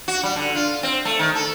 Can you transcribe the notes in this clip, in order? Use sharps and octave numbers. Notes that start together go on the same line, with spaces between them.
F#4
G3
D3
F4
C4
A3
D#3
A4